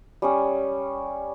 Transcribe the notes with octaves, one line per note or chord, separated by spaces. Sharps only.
G3 C#4 D#6